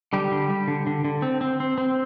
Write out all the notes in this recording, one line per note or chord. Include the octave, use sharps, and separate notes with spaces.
D3 G3 G4
D3
G3
D3
D3
D3
C4
C4
C4
C4